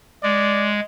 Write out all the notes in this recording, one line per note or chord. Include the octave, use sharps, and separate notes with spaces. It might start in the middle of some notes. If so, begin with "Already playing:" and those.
G#3 D5